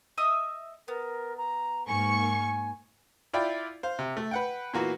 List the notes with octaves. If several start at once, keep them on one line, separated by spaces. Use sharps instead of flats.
D#5 E5 D#6
B3 A#4
A#5
G#2 A#3 G#5 C#6
E4 F4 D5 E5 G5 B5
C5 F5
C3
A3
B4 F#5 G5
A#2 E3 A#3 B3 F#4